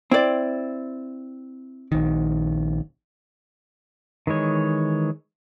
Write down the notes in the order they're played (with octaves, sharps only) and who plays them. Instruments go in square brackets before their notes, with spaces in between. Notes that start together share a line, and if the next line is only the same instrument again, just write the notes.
[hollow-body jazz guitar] C4 [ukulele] E4 D5
[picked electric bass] A#1 D#3
[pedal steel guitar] D#3 E3 G#3 C#5